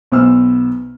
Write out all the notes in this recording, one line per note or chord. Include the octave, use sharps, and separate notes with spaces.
B1 B3 C5 E6 F6